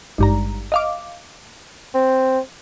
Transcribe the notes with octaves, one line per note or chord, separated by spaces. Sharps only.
G#1 G2 A#5
D#5 F5 D6
C4